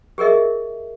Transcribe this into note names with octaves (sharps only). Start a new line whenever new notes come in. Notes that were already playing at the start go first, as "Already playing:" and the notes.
G4 G#4 A#4 D#5 E5